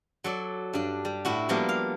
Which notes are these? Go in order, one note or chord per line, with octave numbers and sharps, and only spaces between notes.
F#3 A4 D5
G2 D4
G3
A2 E4 F#4
F3 G3 A#3 B3 D4 E4
F5